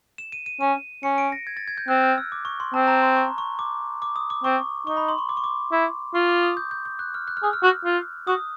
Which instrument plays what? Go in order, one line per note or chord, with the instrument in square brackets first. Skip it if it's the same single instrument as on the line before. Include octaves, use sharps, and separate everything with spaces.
[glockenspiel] E7
D#7
D#7
[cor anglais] C#4 [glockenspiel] D#7
[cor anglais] C#4 [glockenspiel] C#7
[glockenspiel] D7
A#6
G#6
A6
G#6
G6
[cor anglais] C4 [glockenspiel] F#6
[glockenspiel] F6
E6
D6
C#6
C6
[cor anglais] C4 [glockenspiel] A5
[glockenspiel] A#5
C6
C#6
C#6
D6
D6
D#6
D6
[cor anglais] C4 [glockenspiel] C#6
[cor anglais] D#4 [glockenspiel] C#6
[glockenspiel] B5
C6
C#6
D6
C#6
D6
[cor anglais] E4
[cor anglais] F4 [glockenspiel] C#6
[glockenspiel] D6
D#6
G6
G6
G6
F#6
F6
F#6
F6
[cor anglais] G#4 [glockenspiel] E6
[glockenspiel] F6
[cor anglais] F#4
F4
[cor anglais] F#4 [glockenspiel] D#6